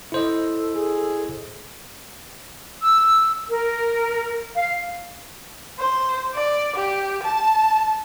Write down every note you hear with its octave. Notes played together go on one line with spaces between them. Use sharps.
E4 A4 C5 D#5
G#4
E6
A#4
F5
C5
D5
G4
A5